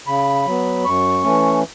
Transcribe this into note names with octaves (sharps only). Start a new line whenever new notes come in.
C#3 B5
F#3 B3
F#2 C#6
E3 A3 C#4